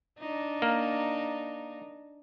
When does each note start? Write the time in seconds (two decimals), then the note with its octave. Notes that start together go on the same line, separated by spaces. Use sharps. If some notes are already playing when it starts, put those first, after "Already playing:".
0.20 D4 D#4
0.62 A#3